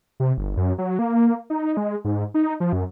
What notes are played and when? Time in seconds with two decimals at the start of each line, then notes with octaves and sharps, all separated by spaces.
0.20 C3
0.38 G1
0.57 F#2
0.78 F#3
0.99 A#3
1.50 D#4
1.77 G#3
2.05 G#2
2.34 D#4
2.60 F3
2.73 F#2